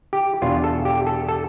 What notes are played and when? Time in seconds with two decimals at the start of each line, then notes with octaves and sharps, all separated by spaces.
0.13 G4
0.42 E2 B2 B3 D4 F4
0.64 A4
0.85 G4
1.07 A4
1.29 A4